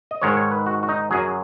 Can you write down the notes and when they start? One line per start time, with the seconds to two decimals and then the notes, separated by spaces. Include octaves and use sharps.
0.11 D#5
0.22 G#2 D#3 G#3 C#5
0.37 C#5
0.51 B4
0.66 F#4
0.83 F#4
0.89 D#4
1.11 F#2 F#3 G#4